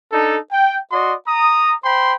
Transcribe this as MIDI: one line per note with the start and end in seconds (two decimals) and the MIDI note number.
0.12 0.38 62
0.12 0.38 63
0.12 0.38 69
0.52 0.77 79
0.92 1.14 66
0.92 1.14 74
0.92 1.14 75
0.92 1.14 84
1.28 1.74 82
1.28 1.74 87
1.84 2.14 72
1.84 2.14 79
1.84 2.14 83
1.84 2.14 84